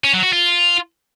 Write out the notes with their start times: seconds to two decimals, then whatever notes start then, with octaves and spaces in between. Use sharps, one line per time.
0.04 C#4
0.14 F#3
0.23 F#4
0.33 F4